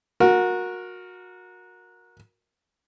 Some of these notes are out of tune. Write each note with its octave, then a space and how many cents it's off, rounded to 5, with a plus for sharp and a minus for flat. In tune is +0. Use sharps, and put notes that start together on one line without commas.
F#4 -25 A#4 +5